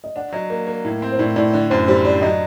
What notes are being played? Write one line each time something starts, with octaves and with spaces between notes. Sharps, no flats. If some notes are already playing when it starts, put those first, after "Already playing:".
D#5
D4 F#5
F#3 D#5
A#3
A#3
A2
C4
C5
A2 D5
A2 D5
D3 D5
F#2 C5
G3 C5
D4 D5
F#3 D#5